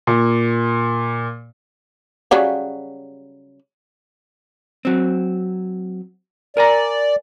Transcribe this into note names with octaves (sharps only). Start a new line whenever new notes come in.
A#2
C#3 F#3 G3
F#3 C4
A#4 D5 G#5 A#5